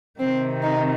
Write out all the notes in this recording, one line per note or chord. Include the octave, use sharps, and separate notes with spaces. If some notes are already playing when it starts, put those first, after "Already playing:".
C3 D#3 C4
D#4